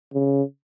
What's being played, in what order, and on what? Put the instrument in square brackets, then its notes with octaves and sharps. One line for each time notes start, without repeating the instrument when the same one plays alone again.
[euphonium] C#3